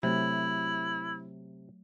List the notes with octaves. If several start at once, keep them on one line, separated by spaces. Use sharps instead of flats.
C3 F#3 A3 E4 C#5